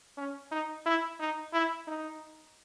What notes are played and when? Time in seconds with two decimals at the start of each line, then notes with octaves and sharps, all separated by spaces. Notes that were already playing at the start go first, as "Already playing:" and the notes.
0.18 C#4
0.51 D#4
0.86 E4
1.20 D#4
1.53 E4
1.87 D#4